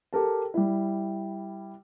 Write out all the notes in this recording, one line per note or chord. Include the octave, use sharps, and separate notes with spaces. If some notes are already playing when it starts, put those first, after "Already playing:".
G4 A4 A#4 A5
G3 E4